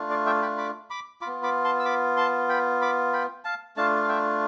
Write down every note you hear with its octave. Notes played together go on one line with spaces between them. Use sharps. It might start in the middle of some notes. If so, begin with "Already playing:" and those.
Already playing: A3 D4 F4
D5 F5
E5 G5
G5 B5
B5 D6
B5 D6
F4 B5 D6
B3
B5 D6
A5 C6
E6
B5 D6
A5 C6
G5 B5
B5 D6
G5 B5
F5 A5
A3 D4 F4 F5 A5
F5
E5 G5